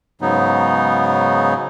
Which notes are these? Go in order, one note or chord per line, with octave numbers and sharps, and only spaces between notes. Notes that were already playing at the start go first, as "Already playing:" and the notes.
G#2 C#3 F#3 B3 D#4